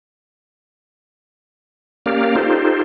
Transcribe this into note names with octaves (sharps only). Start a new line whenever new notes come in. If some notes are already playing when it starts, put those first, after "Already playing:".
A#3 C#4 G4 A#4 D5 F5
D#4 F4 G4 A4 C5